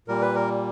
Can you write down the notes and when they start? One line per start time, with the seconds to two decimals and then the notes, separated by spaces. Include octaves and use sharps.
0.08 A#2 G3 A#4
0.21 B4
0.35 A#4